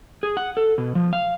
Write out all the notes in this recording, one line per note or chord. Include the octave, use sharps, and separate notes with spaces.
G#4
F#5
A4
B2
F3
F5